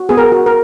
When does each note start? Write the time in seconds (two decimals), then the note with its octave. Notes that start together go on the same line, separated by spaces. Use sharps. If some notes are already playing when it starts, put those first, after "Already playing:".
Already playing: F#4
0.09 B3 G#4
0.17 A#4
0.32 F#4
0.46 A#4